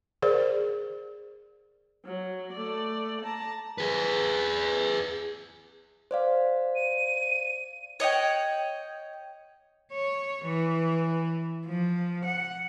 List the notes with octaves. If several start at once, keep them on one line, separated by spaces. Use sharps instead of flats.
G#4 A#4 C5 D5
F#3
A3 D5
A5 A#5
G#4 B4
C5 D5 F5
D#7
C#5 D#5 F#5 G5
C#5
E3
F3
F#5